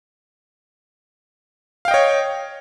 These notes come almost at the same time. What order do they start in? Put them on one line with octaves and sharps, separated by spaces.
F5 G5 D#5 C#5